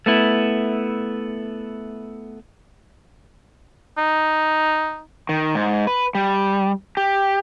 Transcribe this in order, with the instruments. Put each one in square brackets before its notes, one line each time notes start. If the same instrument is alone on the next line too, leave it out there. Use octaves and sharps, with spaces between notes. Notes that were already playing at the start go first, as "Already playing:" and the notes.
[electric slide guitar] A3 B3 E4
[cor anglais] D#4
[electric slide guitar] D#3
G#2
B4
G3
G4